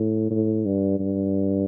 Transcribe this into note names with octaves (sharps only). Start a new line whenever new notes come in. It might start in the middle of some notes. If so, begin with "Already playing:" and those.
Already playing: A2
A2
G2
G2